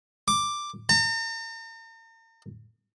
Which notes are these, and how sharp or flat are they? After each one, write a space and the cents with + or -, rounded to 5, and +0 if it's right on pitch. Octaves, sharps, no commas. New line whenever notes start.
D6 +5
A#5 -45